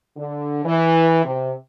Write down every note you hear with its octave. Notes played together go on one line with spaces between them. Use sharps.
D3
E3
C3